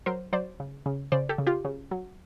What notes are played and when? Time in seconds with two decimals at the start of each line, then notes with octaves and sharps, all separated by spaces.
0.06 F#3 A#4 C5
0.33 F#3 C5 D5
0.60 C#3
0.86 C#3
1.12 C#3 C5 D5
1.29 G4 A4
1.38 C#3
1.46 F4 G4
1.65 C#3
1.91 F#3